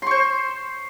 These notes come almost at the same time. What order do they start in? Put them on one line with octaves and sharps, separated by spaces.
C6 C#6 C5